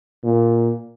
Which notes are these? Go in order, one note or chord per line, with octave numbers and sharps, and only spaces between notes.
A#2